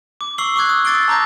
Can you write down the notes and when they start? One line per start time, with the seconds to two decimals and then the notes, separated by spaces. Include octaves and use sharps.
0.21 D6
0.38 C#6 E6 C7 F#7 G7
0.56 C#6 D6 E6 F#6 G#6
0.69 D#6
0.85 D6 E6 A6 C7 D7 G7
1.08 A5 A#5 D6 G6 A#6